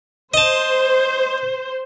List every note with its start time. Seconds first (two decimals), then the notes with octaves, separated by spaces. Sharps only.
0.34 C5 D#5 A5